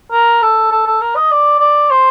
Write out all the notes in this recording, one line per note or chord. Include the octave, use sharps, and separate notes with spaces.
A#4
A4
A4
A4
A#4
D#5
D5
D5
C5